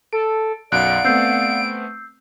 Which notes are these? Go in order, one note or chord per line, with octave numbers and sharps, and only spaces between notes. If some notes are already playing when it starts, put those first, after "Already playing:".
A4 D7
B1 F#2 D5 F5 F#5 F#6 D7
A3 B3 C4 E6 G6 C7